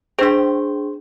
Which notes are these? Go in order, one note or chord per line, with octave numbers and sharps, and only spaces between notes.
C4 D4 G#4 C5